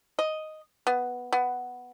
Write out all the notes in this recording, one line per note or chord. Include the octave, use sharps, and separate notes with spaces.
D#5
B3
B3